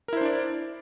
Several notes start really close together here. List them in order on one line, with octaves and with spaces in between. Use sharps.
A#4 E4 C5 D4 D5